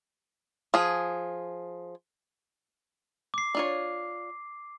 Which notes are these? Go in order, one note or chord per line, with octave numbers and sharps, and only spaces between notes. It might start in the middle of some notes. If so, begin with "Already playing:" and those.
F3 G#4
D6 C7
D4 F4 C#5